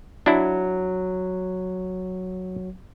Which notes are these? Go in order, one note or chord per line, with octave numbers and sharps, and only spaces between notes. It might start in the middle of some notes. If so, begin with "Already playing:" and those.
F#3 D4 E4